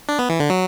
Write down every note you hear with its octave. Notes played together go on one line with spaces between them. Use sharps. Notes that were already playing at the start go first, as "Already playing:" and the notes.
D4
B3
E3
D3
F#3